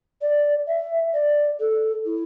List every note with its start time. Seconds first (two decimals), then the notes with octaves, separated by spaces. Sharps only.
0.22 D5
0.68 E5
1.14 D5
1.60 A4
2.06 E4